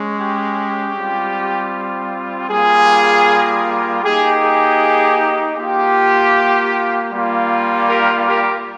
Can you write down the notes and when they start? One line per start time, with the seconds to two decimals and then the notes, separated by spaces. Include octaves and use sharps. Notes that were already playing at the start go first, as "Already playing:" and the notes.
Already playing: G#3 C#4
0.19 G4
0.96 G3 C4 F4
2.49 G3 A#3 F4 G#4
4.04 A#3 D#4 G4 G#4
4.43 G#4
5.57 A#3 F4 G4
7.12 G3 A#3 F4
7.88 G4 A#4
8.27 G4 A#4